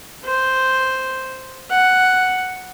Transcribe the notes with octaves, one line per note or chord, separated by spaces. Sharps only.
C5
F#5